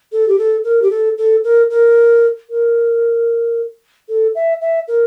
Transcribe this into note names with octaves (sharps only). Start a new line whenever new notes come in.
A4
G4
A4
A#4
G4
A4
A4
A#4
A#4
A#4
A4
E5
E5
A#4